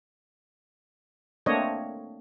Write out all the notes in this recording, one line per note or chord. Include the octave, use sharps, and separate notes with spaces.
A3 A#3 C4 D4 C#5 D#5